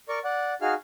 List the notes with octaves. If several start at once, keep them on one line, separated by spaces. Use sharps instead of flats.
A#4 D5 C#6
D5 F#5
D#4 F#4 G#4 F5 F6